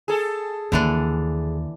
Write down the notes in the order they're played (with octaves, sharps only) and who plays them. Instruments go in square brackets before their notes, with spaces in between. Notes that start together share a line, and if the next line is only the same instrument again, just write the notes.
[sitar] G#4 A4
[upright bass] D#2 [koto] D3 E3 D4